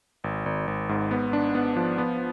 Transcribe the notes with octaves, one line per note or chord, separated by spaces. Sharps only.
G#1
G#1
G#1
G#2
B3
D4
B3
F3
B3